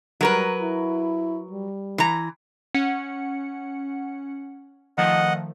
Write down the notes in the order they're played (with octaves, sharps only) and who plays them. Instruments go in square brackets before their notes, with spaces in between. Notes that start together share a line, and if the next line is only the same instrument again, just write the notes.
[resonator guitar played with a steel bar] F#3 A#4 B4 [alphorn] G3
[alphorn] E4
G3
[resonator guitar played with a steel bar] E3 A#5
[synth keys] C#4 F#5 C#7
[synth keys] D#3 F3 A3 [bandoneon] D#5 F#5